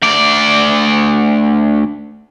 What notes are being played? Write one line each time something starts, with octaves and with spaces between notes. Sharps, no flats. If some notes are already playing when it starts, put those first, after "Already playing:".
D2 D5